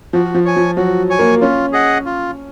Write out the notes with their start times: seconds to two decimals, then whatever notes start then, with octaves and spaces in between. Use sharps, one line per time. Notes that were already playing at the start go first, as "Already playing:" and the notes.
0.13 F3 F#4
0.34 F3
0.45 C#5 G#5
0.56 F3
0.77 F#3 F#4
1.10 C#5 G#5
1.19 A#3
1.41 C#4 F4
1.72 G#4 D#5 F#5
2.06 F4